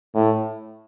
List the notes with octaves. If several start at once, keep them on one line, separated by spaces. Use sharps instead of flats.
A2